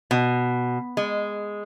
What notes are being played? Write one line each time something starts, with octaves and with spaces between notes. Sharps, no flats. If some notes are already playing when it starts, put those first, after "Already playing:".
B2
G#3